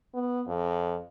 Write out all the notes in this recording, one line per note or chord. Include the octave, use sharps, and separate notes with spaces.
B3
F2